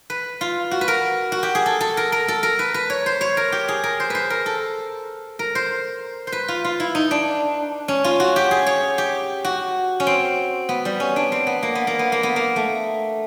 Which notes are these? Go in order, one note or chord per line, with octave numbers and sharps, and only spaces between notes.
B4
F4
F#4
B4
A#4
F#4
G4
G#4
A4
A4
A#4
A#4
A4
A#4
B4
B4
C#5
C5
C#5
A#4
G4
G#4
A#4
C5
B4 C5
A#4
A4
A#4
C5
C5
B4
F4
F4
E4
D#4
D4
C#4
F4
F#4
G4
G#4
C#5
G4
F#4
C#4
C4
B3
G3
C#4
D4
C4
B3
A#3
B3
A#3
B3
A#3
B3
A#3
A3